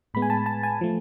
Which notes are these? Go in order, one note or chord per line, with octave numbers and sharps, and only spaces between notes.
A2 G#3 B3 B5
G#5
A5
A5
G#5
F3 A3